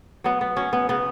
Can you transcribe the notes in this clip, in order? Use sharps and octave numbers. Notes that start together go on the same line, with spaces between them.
F#3 B3
B3
F#3 C#4
B3
C#3 B3